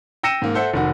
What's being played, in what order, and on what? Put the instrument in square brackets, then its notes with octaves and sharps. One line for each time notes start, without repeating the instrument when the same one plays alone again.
[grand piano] G5 E6 A#6 C#7 D#7 E7
G#2 A#3
A4 C5 E5 F#5
F1 D#3 F#4